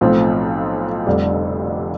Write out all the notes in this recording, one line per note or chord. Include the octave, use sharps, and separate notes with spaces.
B1 A2 F3 C4
F1 F2 D3 G3 D4